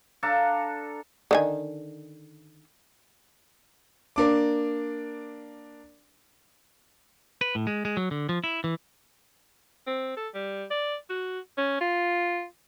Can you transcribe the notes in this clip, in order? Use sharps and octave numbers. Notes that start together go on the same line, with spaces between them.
D4 A4 F5 A#5
D3 D#3 G#5
A#3 D4 D6
B4
A2
G#3
G#3
F#3
D3
F3
E4
E3
C4
A4
G3
D5
F#4
C#4
F4